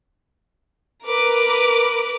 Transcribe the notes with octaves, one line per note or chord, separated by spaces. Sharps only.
A#4 B4 D6